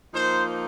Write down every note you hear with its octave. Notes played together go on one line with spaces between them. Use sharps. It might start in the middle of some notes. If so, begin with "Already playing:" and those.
F3 A#3 D#4 C5